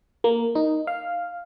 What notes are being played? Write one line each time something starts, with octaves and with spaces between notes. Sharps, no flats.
A#3
D#4
F5